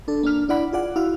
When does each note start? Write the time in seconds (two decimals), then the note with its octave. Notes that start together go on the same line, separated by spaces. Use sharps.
0.08 D4 A4
0.23 A#3 D4 F6
0.49 D4 E4 D5 F#5 B5
0.73 F4 G#4 D5 F#5
0.96 E4 F#4 F5